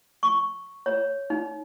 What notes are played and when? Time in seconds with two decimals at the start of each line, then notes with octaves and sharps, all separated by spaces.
0.23 C#6
0.86 C#5
1.30 D#4